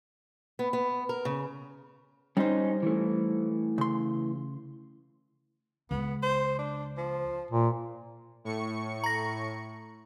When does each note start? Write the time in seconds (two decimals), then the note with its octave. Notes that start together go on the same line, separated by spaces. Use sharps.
0.59 B3
0.73 B3
1.09 A#4
1.25 C#3
2.37 G3 C#4 D#4 C5
2.83 E3 A3
3.78 C#3 C6
5.91 C#2 B3
6.23 C5
6.59 D4
6.97 F3
7.51 A#2
8.44 A2 C#6 C#7
9.04 A#5 A#6